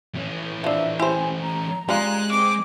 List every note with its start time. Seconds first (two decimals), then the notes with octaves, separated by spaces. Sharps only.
0.14 E3 C#4
0.64 F3 D4 E5
1.00 E4 G4 C5 G#5
1.42 A#5
1.89 G3 G#3 C#4 F4 F#6
2.31 C4 D6